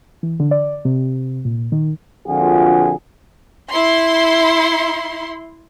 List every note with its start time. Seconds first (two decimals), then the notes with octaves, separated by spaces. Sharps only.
0.23 E3
0.40 D3
0.51 D5
0.85 C3
1.45 A#2
1.72 D#3
2.27 A#1 F2 D3 F4 F#4 G#4
3.70 E4 C6